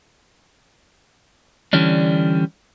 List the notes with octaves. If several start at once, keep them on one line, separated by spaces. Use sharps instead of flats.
D3 E3 G3 C#4 D4